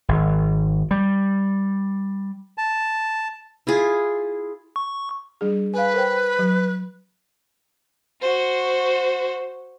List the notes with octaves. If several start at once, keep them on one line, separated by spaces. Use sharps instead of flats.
G#1
G3
A5
E4 F4 G#4
C#6
G3 D4 G#4
B4 F5 G#5
A#4 C5 G5
F#3
F#4 C5